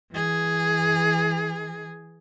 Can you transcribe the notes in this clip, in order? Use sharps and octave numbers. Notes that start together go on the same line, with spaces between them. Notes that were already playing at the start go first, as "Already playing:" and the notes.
E3 G#4